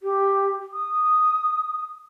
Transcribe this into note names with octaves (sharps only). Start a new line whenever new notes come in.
G4
D#6